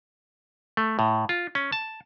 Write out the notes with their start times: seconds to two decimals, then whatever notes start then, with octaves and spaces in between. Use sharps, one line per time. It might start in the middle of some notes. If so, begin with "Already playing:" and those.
0.77 A3
0.99 A2
1.29 F4
1.55 C#4
1.72 A5